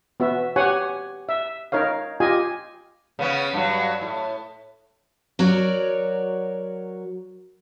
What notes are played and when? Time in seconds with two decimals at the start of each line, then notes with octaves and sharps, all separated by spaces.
0.20 B3 F#4 E5
0.56 G4 C#5 F#5 G#5
1.29 E5
1.72 D#4 A#4 C#5 F5
2.20 F4 G4 D#5 G#5
3.19 C#3 B3 C#4
3.53 G2 F#3
4.01 A2
5.39 F#3 F#4 A#4 C#5 D5